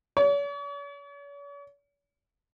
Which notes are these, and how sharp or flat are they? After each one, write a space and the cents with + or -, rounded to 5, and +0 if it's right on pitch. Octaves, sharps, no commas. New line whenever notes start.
C#5 +45